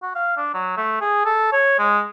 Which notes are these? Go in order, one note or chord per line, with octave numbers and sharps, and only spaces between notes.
F#4
F5
D4
F#3
A3
G#4
A4
C#5
G#3